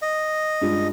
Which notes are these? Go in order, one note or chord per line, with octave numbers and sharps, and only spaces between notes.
D#5
G2 G#3 F4